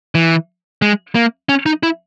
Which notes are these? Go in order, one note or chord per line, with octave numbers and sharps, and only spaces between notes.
E3
G#3
A#3
C#4
D#4
E4